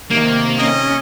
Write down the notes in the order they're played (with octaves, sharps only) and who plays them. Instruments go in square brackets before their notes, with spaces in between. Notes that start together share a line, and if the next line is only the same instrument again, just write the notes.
[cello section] C3 D#3 [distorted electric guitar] A#3
[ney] C#4 [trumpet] D#5